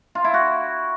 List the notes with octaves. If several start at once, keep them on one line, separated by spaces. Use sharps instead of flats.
F4
E4
F#4